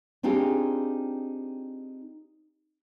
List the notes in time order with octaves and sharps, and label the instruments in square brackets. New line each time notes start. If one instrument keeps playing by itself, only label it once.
[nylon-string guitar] C4 D4 D#4 F4 G4 G#4